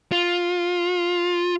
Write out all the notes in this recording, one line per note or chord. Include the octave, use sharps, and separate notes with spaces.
F4